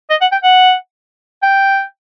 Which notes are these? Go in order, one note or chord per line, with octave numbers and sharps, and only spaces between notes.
D#5
F#5
G5
F#5
G5